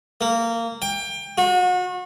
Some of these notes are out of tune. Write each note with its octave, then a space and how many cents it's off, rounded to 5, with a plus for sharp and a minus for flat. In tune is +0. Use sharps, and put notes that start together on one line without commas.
A#3 -20
G5 +25
F#4 -35